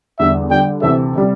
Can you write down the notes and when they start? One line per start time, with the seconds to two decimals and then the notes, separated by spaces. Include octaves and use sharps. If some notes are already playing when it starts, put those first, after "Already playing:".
0.19 E2 D3 G3 E5
0.50 D3 G3 D4 G5
0.82 D2 C3 E3 C4 A4 E5
1.16 C3 G3